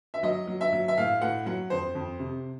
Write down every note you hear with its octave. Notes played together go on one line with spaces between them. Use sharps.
E5
F#3 D#5
F#3
E5
F#3
E5
A2 F5
A2 F#5
F#3 F#5
F2 C5
F2
C3